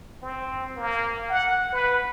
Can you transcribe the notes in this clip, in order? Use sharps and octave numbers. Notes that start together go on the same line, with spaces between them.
C4
A#3
F#5
B4